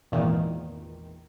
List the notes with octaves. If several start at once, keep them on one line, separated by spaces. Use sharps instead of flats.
G#1 E2 A#2 D#3